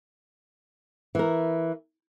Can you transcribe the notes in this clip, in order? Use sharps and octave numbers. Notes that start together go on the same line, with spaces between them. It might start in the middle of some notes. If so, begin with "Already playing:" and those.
E3 A#4